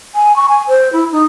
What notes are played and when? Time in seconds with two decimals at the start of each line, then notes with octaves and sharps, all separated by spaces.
0.15 G#5
0.36 C#6
0.49 G#5
0.68 C5
0.93 E4
1.12 D#4